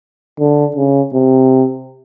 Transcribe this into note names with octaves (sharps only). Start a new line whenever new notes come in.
D3
C#3
C3